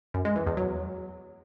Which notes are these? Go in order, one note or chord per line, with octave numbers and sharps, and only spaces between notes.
F#2
G#3
E3
E2
F#3